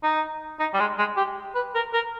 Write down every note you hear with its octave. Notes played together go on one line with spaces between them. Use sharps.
D#4
D#4
G3
G#3
G#3
G4
B4
A#4
A#4